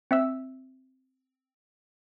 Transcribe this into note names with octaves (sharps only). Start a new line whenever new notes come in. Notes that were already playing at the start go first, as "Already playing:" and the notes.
C4 E5 E6